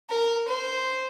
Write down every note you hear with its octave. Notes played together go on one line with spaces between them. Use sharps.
A#4
C5